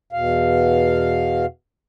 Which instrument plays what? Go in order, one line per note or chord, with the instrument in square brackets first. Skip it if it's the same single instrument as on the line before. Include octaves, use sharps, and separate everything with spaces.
[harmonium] E2 B2 F5